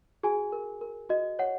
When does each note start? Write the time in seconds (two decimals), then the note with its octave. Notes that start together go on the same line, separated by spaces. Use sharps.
0.23 F#4 G#4 G#5
0.52 A#4
0.81 A#4
1.09 F#4 D#5
1.39 C#5 F#5